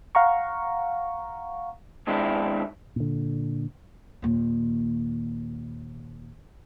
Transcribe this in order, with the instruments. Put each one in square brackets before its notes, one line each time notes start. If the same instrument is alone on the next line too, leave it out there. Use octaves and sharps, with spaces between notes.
[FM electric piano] F5 F#5 A#5 C#6
[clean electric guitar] B2 D#3 G#3 C4 D4 E4
[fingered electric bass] A#2 D3
[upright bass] D#2 A#2